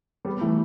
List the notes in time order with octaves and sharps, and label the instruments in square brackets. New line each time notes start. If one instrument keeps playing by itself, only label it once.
[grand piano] G3 B3
E3 A3